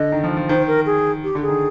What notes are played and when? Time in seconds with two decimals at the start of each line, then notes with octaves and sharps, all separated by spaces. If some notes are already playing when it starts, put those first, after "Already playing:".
Already playing: D3 D#5
0.12 D#3
0.24 F3
0.37 F3
0.49 D#3 C5
0.68 A#4
0.86 G#4
1.24 G4
1.35 D3
1.42 G#4
1.48 D#3